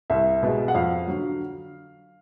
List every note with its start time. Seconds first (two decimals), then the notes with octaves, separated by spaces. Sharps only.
0.10 C2 E5
0.43 B2 G#3
0.68 F#5
0.75 F2 F5
1.07 D3 F#3